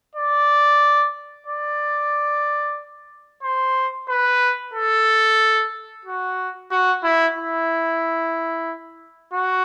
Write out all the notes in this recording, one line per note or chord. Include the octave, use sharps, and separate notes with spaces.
D5
D5
C5
B4
A4
F#4
F#4
E4
E4
F#4